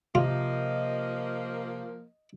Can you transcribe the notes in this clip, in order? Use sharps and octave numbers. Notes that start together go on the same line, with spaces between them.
C3 F3 A#3 F4 D#5